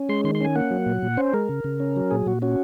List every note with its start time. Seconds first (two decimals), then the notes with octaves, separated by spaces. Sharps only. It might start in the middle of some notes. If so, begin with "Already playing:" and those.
Already playing: C#4
0.09 G#3 C6
0.24 D#3 C6
0.35 C6
0.41 C#4 G#5
0.55 A#3 F#5
0.71 F#3
0.86 A#2
1.02 A#2
1.17 C#4 C5
1.33 G#3 A#4
1.49 C#3
1.64 C#3
1.80 C#4
1.96 F#3
2.11 A#2 G#4
2.26 A#2 F#4
2.42 C#4 F#4